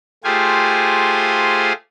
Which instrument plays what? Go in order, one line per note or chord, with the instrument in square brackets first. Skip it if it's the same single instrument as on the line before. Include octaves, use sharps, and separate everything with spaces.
[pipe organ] A3 F4 G4 G#4 C5 G#5